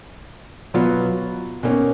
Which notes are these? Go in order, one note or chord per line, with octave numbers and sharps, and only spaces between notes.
B2 F#3 B3 F4
B2 A#3 C#4